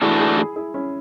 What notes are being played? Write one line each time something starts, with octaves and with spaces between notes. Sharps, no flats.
E3 A3 D4 E4 F#4 G#4
E4 G#4
E4 G#4
E4 G#4
C#4 E4